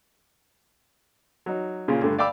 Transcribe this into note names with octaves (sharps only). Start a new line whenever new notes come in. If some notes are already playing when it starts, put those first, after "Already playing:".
F#3 D#4
A#2 C#3 F4
G2 D3 A3
D5 F5 G5 B5 D6 E6